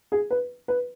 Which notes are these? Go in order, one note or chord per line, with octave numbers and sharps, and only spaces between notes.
G#4
B4
B4